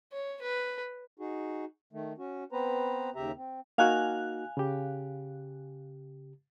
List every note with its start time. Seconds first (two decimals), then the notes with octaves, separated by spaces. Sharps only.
0.12 C#5
0.41 B4
1.20 D#4 F#4 G#4
1.93 D#3 A3
2.18 C#4 F#4
2.52 B3 C4 B4 C5 A#5
3.15 D#2 C#3 G4 E5 A#5
3.36 C4
3.78 A#3 D#4 F#4 F5 G#5 F#6
4.57 C#3 G4